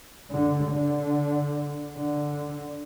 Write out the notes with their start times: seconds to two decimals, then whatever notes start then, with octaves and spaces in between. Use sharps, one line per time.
0.31 D3
0.72 D3
1.96 D3